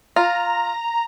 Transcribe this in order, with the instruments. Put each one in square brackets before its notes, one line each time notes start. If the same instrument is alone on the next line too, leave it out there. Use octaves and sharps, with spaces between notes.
[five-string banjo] F4 [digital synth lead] A#5